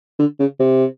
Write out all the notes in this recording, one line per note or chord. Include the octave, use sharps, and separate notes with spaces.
D3
C#3
C3